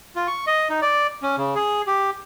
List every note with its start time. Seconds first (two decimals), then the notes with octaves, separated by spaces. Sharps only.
0.16 F4
0.28 C#6
0.47 D#5
0.70 D#4
0.82 D5
1.22 C#4
1.37 C#3
1.55 G#4
1.87 G4